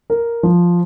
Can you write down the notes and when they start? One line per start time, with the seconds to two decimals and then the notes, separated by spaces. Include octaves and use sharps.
0.10 A#4
0.43 F3